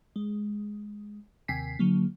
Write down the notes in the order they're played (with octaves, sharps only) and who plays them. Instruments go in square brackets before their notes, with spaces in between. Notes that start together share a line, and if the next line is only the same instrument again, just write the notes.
[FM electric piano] G#3
D#2 C3 G5 G#5 B6 C7
D3 F#3 A#3